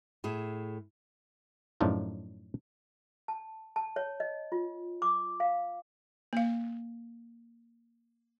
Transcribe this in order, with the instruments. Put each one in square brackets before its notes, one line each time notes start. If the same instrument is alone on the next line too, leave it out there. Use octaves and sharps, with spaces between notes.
[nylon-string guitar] A2 G#4 E5
[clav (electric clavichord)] F#2 A2 F3 D4 D#4 F4
[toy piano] A5
A5
C#5
D#5
F4
D6
F5
[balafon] A#3 F5